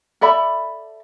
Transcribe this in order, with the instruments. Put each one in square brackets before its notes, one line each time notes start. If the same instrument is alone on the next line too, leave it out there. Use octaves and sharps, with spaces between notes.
[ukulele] A4 D5 E5 B5